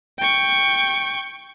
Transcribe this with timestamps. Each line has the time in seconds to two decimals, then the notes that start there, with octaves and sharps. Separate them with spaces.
0.19 G5 C#6